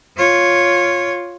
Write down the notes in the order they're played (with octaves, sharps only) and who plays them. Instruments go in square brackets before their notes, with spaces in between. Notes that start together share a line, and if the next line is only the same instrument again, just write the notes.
[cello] F4 C#5